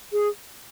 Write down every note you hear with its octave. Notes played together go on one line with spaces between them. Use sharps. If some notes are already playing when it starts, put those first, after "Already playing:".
G#4